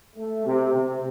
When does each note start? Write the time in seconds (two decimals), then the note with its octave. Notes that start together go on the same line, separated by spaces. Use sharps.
0.16 A3
0.46 C3
0.74 C3